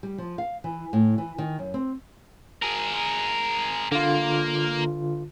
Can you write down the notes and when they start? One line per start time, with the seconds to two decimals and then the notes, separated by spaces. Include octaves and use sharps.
0.03 G3
0.18 F3
0.38 F5
0.64 E3
0.93 A2
1.18 E3
1.38 D#3
1.59 F#2
1.74 C4
2.62 G#4 A#4
3.92 D3 A#3 F4